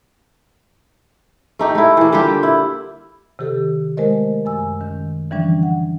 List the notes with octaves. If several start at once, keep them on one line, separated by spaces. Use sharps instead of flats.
A3 D#4 G4
A3 E4
E3 A#3
D3 G3 F4 G4
E4
C3 D#3 G4 A4
G#3 A3 A#4 C5 D#5
F#2 G#5 E6
D#3 C#4
D3 E3 F3 G3 C#4 D4
F#5